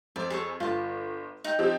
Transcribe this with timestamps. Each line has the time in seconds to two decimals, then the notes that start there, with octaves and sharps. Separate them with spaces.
0.16 F2 C5 D5
0.30 G#4 A4 C#5
0.60 G1 F4 A5
1.44 D#4 G5
1.59 F3 C4 G4